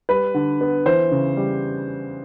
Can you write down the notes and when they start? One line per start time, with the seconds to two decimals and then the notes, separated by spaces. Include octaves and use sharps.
0.09 G3 B4
0.34 D3
0.61 B3
0.86 E3 C5
1.11 C#3
1.37 G3